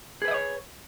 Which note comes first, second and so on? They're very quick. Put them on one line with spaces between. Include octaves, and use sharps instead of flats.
G#4 B4 E5 D#5 C#5